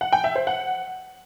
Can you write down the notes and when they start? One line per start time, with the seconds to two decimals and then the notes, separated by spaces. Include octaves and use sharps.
0.01 F#5
0.13 G5
0.24 E5
0.35 C5
0.47 F#5